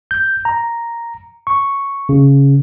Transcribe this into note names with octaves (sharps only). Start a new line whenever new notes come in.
G6
A#5
C#6
C#3